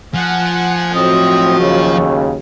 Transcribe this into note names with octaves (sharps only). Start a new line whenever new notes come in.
F3 F#5 G#5
A2 F#3 C4 D#5
D#2 C#3 A3